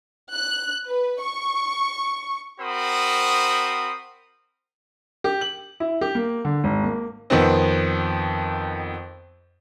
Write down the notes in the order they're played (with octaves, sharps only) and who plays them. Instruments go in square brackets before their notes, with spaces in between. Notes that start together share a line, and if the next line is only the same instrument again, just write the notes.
[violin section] F#6
B4
C#6
[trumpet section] C4 F#4 A#4 C5 B5 D#6
[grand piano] G4
F#7
E4
G4
A#3
D3
G#1
A#3
F2 D#3 B3 C4